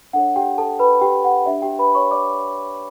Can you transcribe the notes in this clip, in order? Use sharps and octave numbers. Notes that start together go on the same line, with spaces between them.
D4 A4 C#5 F#5
G4 G5
A4 A5
B4 B5
G4 G5
F#5
D4 G4 D5 E5
G4 G5
B4 B5
C#5 C#6
D5 D6